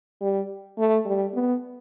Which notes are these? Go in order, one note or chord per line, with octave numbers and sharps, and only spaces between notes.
G3
A3
G3
B3